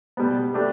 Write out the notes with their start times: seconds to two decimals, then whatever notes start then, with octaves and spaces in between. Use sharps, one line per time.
0.17 B2 G3 B3
0.54 A3 D4 G4